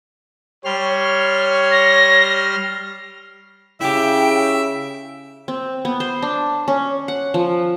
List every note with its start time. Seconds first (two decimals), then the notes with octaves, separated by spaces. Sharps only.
0.65 G3 C#5 C6 F6
1.71 A#6
3.81 C#3 E4 G4 E5 G5
5.48 C4
5.85 B3
6.00 C5
6.22 D4
6.68 C#4
7.08 F#5
7.34 F3